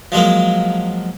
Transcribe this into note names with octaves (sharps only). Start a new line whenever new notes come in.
F3 F#3 G#3 A#3